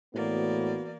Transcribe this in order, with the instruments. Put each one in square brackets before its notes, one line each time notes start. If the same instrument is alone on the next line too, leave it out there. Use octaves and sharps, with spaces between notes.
[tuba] A2 [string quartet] E3 A#3 D5 [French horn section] B3 F#4